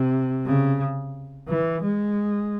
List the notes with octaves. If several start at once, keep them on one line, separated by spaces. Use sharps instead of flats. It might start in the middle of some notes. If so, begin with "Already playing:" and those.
Already playing: C3
C#3
E3
G#3